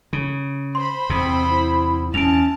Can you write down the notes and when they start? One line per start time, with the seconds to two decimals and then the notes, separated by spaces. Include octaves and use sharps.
0.13 C#3
0.75 C5 B5 C6
1.10 E2 C3 C4
1.49 E4
2.14 E2 C#4 A5 D7 F7